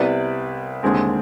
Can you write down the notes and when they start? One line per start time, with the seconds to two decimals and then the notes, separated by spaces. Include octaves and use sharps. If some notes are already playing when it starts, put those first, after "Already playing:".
Already playing: C2 C3 G3 B3 B4 D5
0.83 D#2 D3 G#3 C4